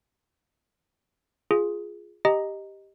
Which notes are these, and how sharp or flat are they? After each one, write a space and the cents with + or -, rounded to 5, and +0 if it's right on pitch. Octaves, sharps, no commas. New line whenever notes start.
F4 +0 G#4 +0
G4 +0 D#5 +0 A#5 +0